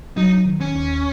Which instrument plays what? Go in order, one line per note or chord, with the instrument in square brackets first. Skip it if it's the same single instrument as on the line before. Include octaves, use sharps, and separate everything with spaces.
[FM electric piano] F#3 [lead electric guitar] D#4
[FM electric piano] D#3
[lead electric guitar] C#4
[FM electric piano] D#2